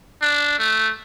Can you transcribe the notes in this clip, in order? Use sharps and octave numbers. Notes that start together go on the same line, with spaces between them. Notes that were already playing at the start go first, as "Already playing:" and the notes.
D4
A3